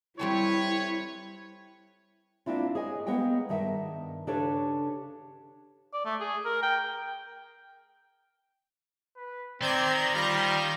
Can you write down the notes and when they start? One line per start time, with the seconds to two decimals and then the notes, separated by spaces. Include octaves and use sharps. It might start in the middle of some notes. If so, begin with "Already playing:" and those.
0.19 G3 C4 E4 A4 B4 C#5
2.46 A#3 C4 D4 E4 F4
2.75 G#4 C#5 D#5 G#5
3.07 A#3 B3 G#4 D#5 G5
3.49 G2 D#3 E5
4.27 C#3 D4 G4 A4 B4 C#5
5.93 D5
6.05 A3
6.20 G#4
6.45 A#4
6.63 G5
9.16 B4
9.62 D#3 C4 D5 A#5 G6 G#6
10.15 G3 F4 A#5 G6 A#6